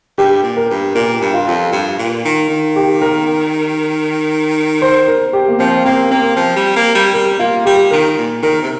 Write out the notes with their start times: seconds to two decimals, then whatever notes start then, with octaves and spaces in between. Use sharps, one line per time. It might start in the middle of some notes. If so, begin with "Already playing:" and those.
0.18 G2 G4
0.43 A#2
0.57 A#4
0.70 G2
0.95 A#2 A#4
1.21 G2
1.34 F4
1.47 F2
1.72 G2
1.98 A#2
2.25 D#3
2.49 D#3
2.76 G4
3.02 A#4
4.82 C5
5.08 A#4
5.33 G4
5.48 A#3
5.59 F3 C4
5.85 A#3 C4
6.11 A#3 C4
6.36 F3
6.56 G3
6.76 A#3
6.95 G3
7.14 G3 A#4
7.39 A#3 F4
7.65 G3 G4
7.91 D#3 A#4
8.18 A#2
8.42 D#3 A#4
8.62 C3